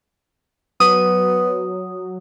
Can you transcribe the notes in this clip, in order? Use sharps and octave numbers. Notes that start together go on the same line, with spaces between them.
F#3 B3 D#6